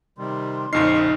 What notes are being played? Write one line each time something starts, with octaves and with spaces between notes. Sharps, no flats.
C3 D#3 G3 C6
A#1 F2 C#3 D#4 D#5 C#6 F6 C7